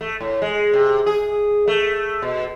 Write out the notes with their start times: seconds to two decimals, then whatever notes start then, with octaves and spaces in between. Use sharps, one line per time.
0.01 A3
0.20 A2
0.42 G#3
0.73 C3
1.06 G#4
1.68 A3
2.22 B2